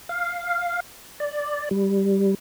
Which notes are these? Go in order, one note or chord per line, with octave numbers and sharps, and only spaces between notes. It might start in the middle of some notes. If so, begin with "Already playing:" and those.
F5
D5
G3